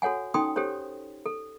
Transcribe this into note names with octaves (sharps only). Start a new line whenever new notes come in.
F#4 A4 C#5 F#5 G#5
C#4 D#4 A4 G5 C6 D#6
G4 A4 C5 C#5
A4